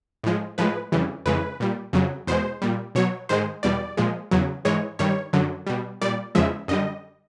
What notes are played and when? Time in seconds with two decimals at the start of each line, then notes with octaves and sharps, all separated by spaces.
0.24 A2 F3 G#3
0.58 A2 F3 G#3 B4
0.92 F2 C#3 E3 G3
1.26 F2 C#3 E3 G#3 B4
1.60 A#2 G3
1.93 F2 C#3 F#3
2.27 E2 B2 G#3 C5
2.62 A#2 G3
2.95 B2 F#3 C#5
3.29 G#2 D#3 G#3 C5
3.63 E2 B2 G3 D5
3.97 A#2 F3 G#3
4.31 E2 C#3 F#3
4.65 G#2 E3 G#3 C#5
4.99 G2 D#3 G3 C#5
5.33 F#2 D3 F#3
5.67 B2 G3
6.02 A#2 G3 D5
6.35 E2 C#3 F3 G#3 E5
6.68 F#2 D3 G3 D#5